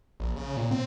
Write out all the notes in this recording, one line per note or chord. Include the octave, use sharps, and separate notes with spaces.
A#1
C#3
A#2
C4